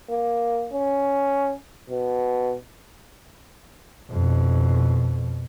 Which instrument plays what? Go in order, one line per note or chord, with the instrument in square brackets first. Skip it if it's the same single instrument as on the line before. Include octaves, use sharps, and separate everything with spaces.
[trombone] A#3
C#4
B2
[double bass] F2 B2